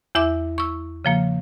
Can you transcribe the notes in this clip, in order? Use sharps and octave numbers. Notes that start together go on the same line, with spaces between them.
E2 E4 E5 D6
C#6 E6
C#3 F3 A#3